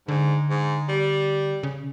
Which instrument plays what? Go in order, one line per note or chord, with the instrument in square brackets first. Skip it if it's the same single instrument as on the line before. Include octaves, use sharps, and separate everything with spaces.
[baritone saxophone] G#2 [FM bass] D3
[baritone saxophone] G#2
G3
[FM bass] C#3